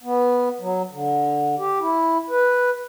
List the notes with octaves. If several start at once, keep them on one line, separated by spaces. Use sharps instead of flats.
B3
F#3
D3
G4
E4
B4